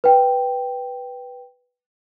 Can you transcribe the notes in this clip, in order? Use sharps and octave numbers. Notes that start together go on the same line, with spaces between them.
B4 G5